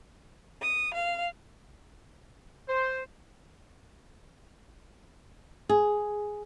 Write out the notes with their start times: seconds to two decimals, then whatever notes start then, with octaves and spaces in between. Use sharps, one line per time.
0.60 D#6
0.93 F5
2.69 C5
5.69 G#4